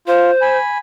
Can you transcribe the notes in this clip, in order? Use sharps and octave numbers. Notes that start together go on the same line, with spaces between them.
F4 C5
G#5 B5